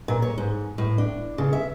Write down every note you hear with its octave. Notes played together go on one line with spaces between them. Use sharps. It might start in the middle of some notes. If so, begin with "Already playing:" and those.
A#2
C#5
G#2
A2
D4
C#3
E5